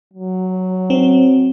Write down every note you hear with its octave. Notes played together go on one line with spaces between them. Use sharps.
F#3
C4